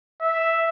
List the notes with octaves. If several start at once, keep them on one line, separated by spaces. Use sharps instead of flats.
E5